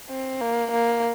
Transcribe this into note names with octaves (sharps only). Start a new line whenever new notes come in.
C4
A#3
A#3